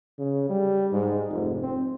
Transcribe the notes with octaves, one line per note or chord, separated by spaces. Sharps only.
C#3
G3
G#2
F1
C4